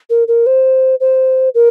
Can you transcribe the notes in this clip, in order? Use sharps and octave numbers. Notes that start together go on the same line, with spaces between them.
A#4
A#4
C5
C5
A#4